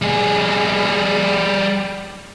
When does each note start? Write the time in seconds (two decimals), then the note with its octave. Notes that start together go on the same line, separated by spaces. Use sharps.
0.02 G3 G#4